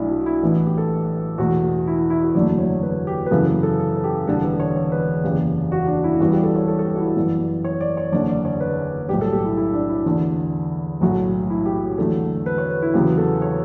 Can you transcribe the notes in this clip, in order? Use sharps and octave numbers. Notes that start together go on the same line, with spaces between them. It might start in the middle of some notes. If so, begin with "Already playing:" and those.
Already playing: B1 B2 A3 D4 E4
F#4
E4
A1 A2 E3 B3 D4
E4
G4
A4
E2 B2 A3 F#4
E4
E4
E4
F#4
F#1 E2 D3 F#3 A3 D5
C#5
B4
G4
B4
F#2 C#3 E3 B3 A4
B4
A4
A4
A4
G4
E1 E2 D3 G3 A4
B4
C#5
C#5
B4
F#1 E2 C#3 G4
F#4
D4
E4
G1 G2 E3 G3 B3 F#4
G4
A4
C#5
A4
A4
G4
F#4
E4
F#2 E3 G3 B3
C#5
D5
C#5
F#1 E2 D3 D5
D5
C#5
B4
B1 A2 G3 G4
A4
G4
E4
E4
D4
E4
E2 D3 A3
B1 A2 F#3 A3 F#4
E4
G4
E2 D3 F#3 A3 A4
B4
C#5
B4
E4
E2 C#3 F#3 B3 G4
A4
C#5